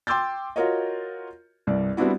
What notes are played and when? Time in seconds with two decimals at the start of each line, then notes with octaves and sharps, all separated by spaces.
0.07 G5 C6 D6 E6 G6 A6
0.56 F4 F#4 A#4 C#5 D#5
1.67 C2 G2 D5
1.97 G3 B3 C4 D4 E4 F#4